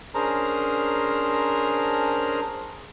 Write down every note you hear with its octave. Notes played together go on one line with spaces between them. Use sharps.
C#4 D4 G#4 A#4 C5 A#5